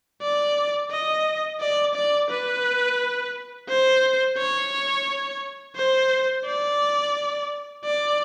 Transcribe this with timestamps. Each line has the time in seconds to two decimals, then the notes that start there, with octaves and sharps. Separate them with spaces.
0.22 D5
0.91 D#5
1.60 D5
1.95 D5
2.30 B4
3.69 C5
4.38 C#5
5.76 C5
6.45 D5
7.85 D5